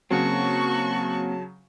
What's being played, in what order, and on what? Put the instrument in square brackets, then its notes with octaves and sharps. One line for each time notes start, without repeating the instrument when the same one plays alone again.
[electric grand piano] C#3 F#3 [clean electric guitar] A#3 C4 [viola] F#4 C#6 [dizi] A5